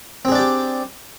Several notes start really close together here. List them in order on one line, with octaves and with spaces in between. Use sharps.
C4 G#4 D4 D5 G4